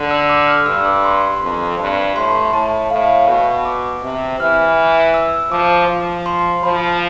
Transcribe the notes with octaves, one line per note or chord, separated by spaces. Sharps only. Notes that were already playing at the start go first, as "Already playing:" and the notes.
Already playing: D3
E6
D6
F6
G2 E6
D6
C6
F2
G2
A2 C6
A2 A5
A2 F5
B2
D6
C3
E3 F6
E6
F3 D6
F3
C6
F3 B5